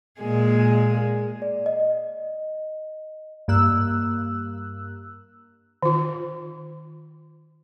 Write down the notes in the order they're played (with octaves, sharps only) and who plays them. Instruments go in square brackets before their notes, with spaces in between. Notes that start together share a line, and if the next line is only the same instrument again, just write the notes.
[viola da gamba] A#2 G#3 G#4
[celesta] D5
D#5
[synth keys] G2 A#3 E6 F#6
[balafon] D#3 F4